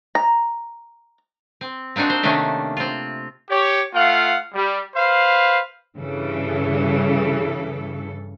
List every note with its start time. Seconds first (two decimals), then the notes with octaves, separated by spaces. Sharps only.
0.15 A#5
1.61 C4
1.96 A#3 C4 D4 D#4 F#4
2.10 C5
2.23 C3 D#3 A3 A#3 C#4 D4
2.77 C4 F4
3.50 G4 C#5
3.94 A3 F4 F5 F#5
4.53 G3
4.96 B4 C5 F5
5.98 G2 C#3 E3 A4